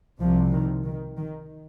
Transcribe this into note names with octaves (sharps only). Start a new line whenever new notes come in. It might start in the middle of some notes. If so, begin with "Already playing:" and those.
C2 C3 F3
D#3
D#3
D#3